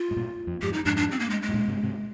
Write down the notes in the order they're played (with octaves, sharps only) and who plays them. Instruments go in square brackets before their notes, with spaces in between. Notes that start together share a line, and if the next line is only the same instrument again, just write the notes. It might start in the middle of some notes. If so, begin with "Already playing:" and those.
Already playing: [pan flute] F4
[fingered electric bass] G#2
G2 A#2
F2
[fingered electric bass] F2 G#2 [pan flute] G4
[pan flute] D#4
[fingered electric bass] F2 G#2 [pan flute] D4
[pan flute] D4
C4
A#3
G#3
G#3
[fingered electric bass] G#2
G2 A#2
G#2 C3
G#2 C3